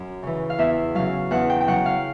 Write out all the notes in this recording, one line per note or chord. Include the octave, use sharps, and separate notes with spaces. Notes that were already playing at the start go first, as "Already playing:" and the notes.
Already playing: F#2
C#3 E3
F5
E2 E5
C#3 F#3 F5
E2 F#5
G5
G5
C#3 F#3 F#5
F5